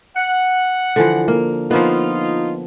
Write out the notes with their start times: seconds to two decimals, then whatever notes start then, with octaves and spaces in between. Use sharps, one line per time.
0.17 F#5
0.96 D3 E3 F3
1.28 A#3
1.71 F3 A#3 B3 D#4 F4